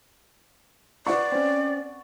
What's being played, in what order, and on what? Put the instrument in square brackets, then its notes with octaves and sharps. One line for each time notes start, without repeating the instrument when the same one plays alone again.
[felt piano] B4 F#5 C#6 [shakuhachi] D5
[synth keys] C4 C#4